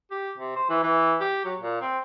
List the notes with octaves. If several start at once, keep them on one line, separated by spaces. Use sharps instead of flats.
G4
C3
C5
E3
E3
G4
F#3
A#2
C4